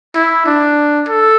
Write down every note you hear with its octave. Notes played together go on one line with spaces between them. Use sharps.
E4
D4
A4